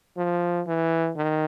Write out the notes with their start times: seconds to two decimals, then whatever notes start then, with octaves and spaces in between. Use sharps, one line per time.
0.17 F3
0.67 E3
1.17 D#3